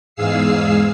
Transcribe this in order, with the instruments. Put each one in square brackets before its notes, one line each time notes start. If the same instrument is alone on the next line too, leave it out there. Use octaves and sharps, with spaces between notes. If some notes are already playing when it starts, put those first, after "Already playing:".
[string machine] E2 G#2 G#4 F5 E6 C7